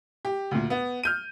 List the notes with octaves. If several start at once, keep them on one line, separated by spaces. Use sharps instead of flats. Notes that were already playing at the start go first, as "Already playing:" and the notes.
G4
D2 A#2
B3
F6 G6 D#7